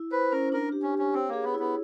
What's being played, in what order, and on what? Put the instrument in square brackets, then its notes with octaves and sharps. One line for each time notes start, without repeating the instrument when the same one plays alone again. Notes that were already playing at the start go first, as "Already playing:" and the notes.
Already playing: [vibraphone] E4
[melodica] B4 [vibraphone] C5
[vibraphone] C#4 [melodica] A#4
[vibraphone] D4 [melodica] A#4
[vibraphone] G4
[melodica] C#4
[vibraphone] G4
[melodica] C#4
[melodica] C4 [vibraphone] C#5
[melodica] A#3 [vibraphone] G#4
[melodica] B3
[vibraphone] E4
[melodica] B3